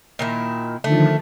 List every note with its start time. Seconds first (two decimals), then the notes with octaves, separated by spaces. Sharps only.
0.19 A#2 D#3 E4
0.84 D3 D#3 F3 A3